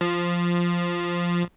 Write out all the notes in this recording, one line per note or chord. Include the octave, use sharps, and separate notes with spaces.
F3